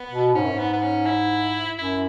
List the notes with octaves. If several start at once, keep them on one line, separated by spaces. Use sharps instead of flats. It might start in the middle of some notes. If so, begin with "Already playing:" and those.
Already playing: B3
B2
G#2 C#4
F#2
G#2
B3
B3
C#4
E4
F#2 E4